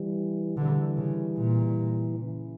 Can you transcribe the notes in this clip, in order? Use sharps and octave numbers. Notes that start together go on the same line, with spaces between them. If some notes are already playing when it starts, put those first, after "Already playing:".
Already playing: E3 G3
D3 E3 G3
C#3
A#2
C#3 E3